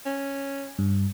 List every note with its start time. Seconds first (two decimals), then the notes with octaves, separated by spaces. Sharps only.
0.06 C#4
0.79 G2